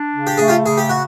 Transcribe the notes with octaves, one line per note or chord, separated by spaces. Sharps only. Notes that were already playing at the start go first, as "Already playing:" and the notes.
Already playing: D4
C#3
G4
A3 G#4
F4 G4
C#3 G#4
G4
F#4